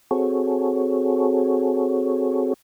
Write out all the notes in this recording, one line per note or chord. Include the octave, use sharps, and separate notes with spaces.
C4 F#4 G#4 A4 C#5